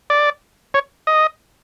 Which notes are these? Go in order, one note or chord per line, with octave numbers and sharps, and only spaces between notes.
D5
C#5
D#5